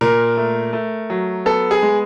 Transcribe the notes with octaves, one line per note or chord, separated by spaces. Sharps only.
A#2 A#4
A3
A3
F#3
B3 A4
G#4
G#3